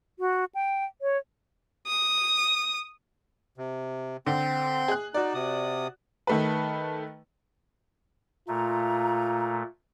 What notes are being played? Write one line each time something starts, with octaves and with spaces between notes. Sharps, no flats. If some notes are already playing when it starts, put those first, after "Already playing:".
F#4
G5
C#5
D#6
C3
D3 C4 C6 G6
G#4 F#6
D#4 F#4 D5
C3 D#6
D#3 A3 B4
A#2 A3 F4 A#5